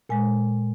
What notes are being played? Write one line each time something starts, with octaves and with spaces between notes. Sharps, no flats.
A#2 G#3 G#5